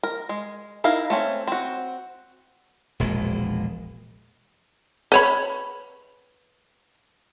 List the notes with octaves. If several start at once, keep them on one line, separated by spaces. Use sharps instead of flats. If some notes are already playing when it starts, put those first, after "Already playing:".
A#4
G#3
D#4 E4 A#4 F5
A3 C4 C#4
C4 F#4
E1 A#1 A#2 G#3
B4 C#5 B5